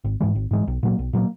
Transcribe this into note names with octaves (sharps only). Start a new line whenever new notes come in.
G#1
G#2 E3 G#3
G#1
G#2 E3 G#3
B1
A#2 F#3 A#3
B1
A#2 F#3 A#3